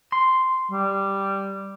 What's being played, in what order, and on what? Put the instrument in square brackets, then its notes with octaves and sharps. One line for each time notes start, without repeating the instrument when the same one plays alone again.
[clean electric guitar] C6
[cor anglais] G3